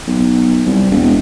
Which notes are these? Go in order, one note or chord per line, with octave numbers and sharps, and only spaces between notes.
B1
C2
E1